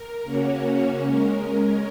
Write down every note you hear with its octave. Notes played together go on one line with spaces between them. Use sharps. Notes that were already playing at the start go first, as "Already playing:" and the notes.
Already playing: A#4
C#3 A#3 C#4 F#4 C#5
G#3 C#4 A#4